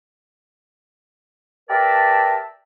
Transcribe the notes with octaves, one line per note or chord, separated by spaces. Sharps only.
G4 A#4 B4 D5 E5 A5